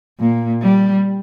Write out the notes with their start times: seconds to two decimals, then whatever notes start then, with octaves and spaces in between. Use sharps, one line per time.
0.20 A#2
0.62 G3